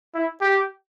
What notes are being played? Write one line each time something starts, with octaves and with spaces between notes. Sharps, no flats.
E4
G4